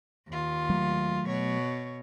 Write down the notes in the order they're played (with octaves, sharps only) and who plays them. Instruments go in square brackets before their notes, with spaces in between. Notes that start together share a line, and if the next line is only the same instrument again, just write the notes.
[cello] D#2 F4
[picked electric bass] F#3 A3
[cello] B2 C#5